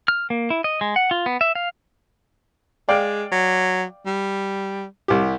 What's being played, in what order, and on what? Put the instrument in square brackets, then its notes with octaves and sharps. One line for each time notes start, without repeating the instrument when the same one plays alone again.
[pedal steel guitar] F6
A#3
E4
D#5
G#3
F#5
F4
B3
E5
F5
[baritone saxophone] G#3 [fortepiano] D5 F5 G5
[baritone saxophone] F#3
G3
[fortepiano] C2 G4